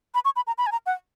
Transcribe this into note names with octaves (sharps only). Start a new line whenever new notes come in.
B5
C#6
B5
A#5
B5
G#5
A#5
F#5